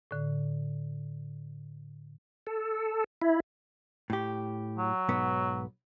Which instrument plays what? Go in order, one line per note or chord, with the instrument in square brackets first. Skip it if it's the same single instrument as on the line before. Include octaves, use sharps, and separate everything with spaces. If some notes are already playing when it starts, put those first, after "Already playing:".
[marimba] A2 D3
[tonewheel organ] A4
E4
[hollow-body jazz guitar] A2 G4
[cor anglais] F#3
[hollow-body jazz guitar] B1 G#2 B3